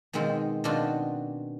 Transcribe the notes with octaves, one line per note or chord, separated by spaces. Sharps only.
B2 D#3 G#3 C4 F4
B2 D#3 C4 D4 F4 F#4